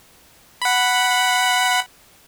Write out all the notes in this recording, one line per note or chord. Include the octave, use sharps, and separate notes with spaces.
F#5 B5